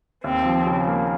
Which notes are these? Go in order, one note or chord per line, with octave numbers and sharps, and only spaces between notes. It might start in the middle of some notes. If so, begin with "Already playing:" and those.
D#2 C4
F3
C#3
A#3